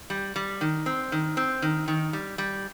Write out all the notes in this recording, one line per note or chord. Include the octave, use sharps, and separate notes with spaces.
G3
G3
D#3
C4
D#3
C4
D#3
D#3
G3
G3